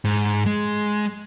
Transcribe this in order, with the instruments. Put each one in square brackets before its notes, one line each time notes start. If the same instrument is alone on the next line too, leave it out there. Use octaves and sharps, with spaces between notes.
[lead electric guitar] G#2
G#3